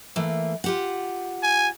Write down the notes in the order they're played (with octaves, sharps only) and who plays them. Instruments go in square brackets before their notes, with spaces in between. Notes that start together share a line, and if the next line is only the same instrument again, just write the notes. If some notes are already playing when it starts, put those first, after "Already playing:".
[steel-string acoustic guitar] E3 A3 A#3
F4 G4 F#5
[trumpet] G#5